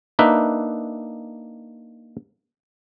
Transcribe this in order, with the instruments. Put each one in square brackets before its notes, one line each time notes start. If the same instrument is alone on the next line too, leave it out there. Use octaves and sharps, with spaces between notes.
[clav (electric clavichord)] A#3 D4 D#4 B4 E5